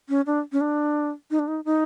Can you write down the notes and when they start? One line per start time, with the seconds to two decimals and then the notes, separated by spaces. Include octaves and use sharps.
0.09 C#4
0.26 D4
0.52 C#4
0.61 D4
1.31 D#4
1.39 D4
1.48 D#4
1.65 D#4